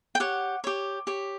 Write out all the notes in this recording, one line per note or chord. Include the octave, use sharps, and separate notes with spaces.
G5
G4 C#5 F#5
G4 C#5
G4 C#5